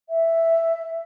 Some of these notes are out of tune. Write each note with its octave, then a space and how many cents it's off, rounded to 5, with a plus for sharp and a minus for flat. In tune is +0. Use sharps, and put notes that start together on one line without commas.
E5 +5